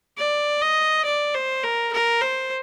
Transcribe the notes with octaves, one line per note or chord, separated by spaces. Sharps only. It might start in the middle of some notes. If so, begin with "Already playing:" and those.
D5
D#5
D5
C5
A#4
A#4
C5